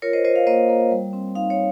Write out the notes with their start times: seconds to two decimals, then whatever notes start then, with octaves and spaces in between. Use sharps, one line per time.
0.02 F4 A#4 C#5
0.13 C5 D#5
0.24 F4 C5 D#5
0.36 C#5 F5
0.47 A#3 C5 D#5
0.69 A#3
0.91 G3
1.13 C4
1.35 D#4 F5
1.50 C#5 F5